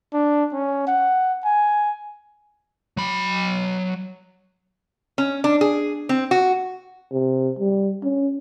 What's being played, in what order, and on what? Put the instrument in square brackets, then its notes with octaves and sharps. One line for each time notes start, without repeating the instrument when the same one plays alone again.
[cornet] D4
C#4
F#5
G#5
[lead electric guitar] F#3 B5
[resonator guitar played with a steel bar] C#4
D4
G#4
C4
F#4
[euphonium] C3
G3
C#4